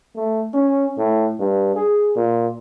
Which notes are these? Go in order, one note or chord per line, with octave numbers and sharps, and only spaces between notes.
A3
C#4
A2
G2
G#4
A#2